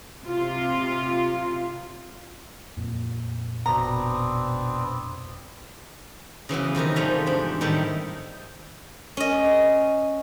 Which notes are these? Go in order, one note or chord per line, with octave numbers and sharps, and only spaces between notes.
C3 F4
F2 A#2
G1 B2 B3 C4 D4 A#5
C#3 E3 F#3 B3
F2 C3 D#3 A#4
G#2 F3 G3 A3
E2 D4
A2 D#3 G3 A3 D#4 E4
C#4 D#5